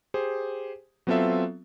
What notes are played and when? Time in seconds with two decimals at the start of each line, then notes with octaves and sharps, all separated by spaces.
0.14 G4 G#4 C5
1.07 F#3 B3 C4 F4 A4 E5